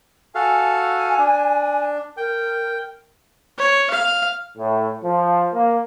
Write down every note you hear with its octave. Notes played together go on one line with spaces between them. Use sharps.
F#4 A4 F5 G#5
D4
A#4 G5
C#5
F5
A2
F3
A#3